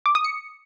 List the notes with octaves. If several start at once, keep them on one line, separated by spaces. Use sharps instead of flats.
D6
D#6
C#7